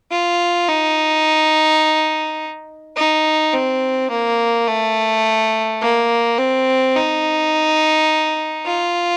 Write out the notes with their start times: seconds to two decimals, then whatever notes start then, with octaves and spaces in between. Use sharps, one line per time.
0.11 F4
0.68 D#4
2.96 D#4
3.54 C4
4.10 A#3
4.68 A3
5.81 A#3
6.38 C4
6.96 D#4
8.66 F4